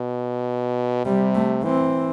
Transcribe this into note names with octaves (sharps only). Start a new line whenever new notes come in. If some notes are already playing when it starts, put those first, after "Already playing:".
Already playing: B2
C3 G3
A3
E3 C4